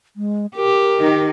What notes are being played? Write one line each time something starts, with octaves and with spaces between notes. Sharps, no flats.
G#3
G4 A#4
D#3 D#4